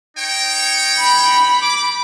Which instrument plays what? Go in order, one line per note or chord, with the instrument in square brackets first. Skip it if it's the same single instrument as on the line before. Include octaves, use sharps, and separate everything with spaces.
[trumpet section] D#4 C#5 G5
[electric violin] B5
[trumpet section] D6